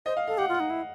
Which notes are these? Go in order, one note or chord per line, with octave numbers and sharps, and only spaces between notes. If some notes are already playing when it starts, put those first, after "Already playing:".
C5 D#5
F5
A4 F5
G4 F#5
F4
F#5
D#4
E4